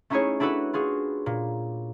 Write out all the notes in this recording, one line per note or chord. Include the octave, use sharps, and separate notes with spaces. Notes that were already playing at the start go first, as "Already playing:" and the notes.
A3 C#4 D#4 E4 G#4 C#5
D4 E4 F#4 A4 B4
F4 F#4 G#4
A#2